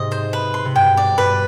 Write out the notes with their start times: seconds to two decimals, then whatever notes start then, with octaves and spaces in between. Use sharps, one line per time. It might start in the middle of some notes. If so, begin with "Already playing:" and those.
Already playing: G#2 C3 D#5
0.12 C5
0.33 B4
0.54 C6
0.65 C3
0.75 G2 B2 G5
0.97 D5
1.18 G2 B4